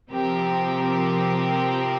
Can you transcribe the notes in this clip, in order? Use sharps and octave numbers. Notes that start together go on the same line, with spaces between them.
C3 F3 C4 G4 A#4